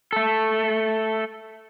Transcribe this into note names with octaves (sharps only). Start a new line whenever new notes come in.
A3 A4